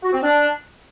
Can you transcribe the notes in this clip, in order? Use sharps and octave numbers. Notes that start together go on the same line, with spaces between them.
F#4
C4
D4